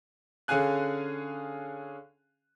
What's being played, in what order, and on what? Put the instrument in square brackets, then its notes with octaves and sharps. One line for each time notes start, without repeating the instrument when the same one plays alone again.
[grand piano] D3 C#4 G#4 F5 G#5 F#6